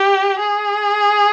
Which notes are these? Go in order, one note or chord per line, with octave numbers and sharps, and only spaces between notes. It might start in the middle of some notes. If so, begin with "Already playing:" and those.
Already playing: G4
G#4